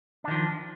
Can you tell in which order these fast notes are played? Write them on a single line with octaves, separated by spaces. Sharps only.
D4 D#3 F3